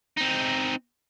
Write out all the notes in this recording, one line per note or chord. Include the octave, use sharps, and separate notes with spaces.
C4 D#4